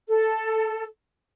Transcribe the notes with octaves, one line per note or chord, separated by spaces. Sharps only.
A4